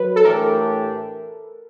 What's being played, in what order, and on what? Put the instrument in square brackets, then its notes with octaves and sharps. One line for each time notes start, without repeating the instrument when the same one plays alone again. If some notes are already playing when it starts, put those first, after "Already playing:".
Already playing: [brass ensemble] F#3 [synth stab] B4
[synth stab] A4
[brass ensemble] A2 E3 A3 D4 G4 [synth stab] A#4